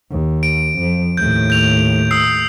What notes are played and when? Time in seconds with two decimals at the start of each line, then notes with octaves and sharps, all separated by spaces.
0.11 D#2
0.43 D7
0.79 F2 F3
1.17 D#2 A2 G6
1.50 G6 F7
2.11 D#6 E6 C7